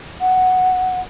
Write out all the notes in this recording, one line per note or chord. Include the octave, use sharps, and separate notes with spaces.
F#5